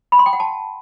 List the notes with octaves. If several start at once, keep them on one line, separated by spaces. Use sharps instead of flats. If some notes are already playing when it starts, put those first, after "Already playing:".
B5
C6
G5
F#5
A5